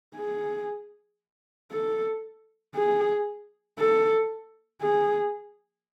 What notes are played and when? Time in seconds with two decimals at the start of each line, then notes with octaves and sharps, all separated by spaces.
0.16 G#4
1.71 A4
2.75 G#4
3.79 A4
4.82 G#4